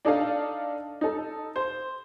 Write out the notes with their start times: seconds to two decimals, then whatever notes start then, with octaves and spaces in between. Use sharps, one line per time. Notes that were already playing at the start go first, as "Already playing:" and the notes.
0.05 D4 D#4 A4 D#5 F5
1.01 D#4 A4
1.56 C5